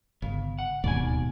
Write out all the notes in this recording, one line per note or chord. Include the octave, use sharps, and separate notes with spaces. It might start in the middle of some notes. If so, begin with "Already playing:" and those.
G1 C#3
F#5
D1 G#1 D#2 G#2 B2 B3 D5 G#5